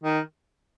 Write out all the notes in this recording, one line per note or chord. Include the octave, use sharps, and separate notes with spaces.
D#3